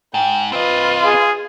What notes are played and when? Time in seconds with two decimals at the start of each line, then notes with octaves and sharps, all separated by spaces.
0.14 G#2 G5
0.53 C4 F4 B4 D#5
1.05 G#4